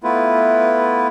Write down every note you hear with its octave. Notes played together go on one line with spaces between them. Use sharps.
A3 B3 E4 F4 B4